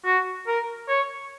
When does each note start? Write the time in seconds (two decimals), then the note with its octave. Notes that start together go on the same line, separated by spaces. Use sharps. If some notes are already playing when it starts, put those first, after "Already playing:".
0.05 F#4
0.47 A#4
0.89 C#5